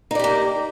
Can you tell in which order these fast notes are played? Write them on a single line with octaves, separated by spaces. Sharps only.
D#4 D5 G4 A#3